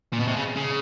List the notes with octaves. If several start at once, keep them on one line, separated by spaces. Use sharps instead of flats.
A#2
B2
C3
C#3
C#3